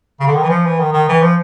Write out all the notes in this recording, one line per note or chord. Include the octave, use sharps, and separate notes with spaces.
C#3
D3
D#3
E3
F3
E3
D#3
D#3
E3
F3